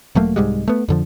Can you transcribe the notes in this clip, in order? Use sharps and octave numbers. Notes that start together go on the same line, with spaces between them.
E1 F#3 A3 A#3
C2 G#2 G3 G#3
A3 B3
F2 D3 F3